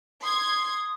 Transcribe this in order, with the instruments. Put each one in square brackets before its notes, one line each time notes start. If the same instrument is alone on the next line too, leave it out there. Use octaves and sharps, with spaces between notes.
[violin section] C6 G#6 [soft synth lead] D#6